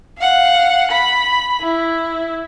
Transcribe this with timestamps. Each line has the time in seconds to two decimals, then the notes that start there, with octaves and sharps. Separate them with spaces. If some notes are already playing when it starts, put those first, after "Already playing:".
0.18 F5 F#5
0.91 B5
1.61 E4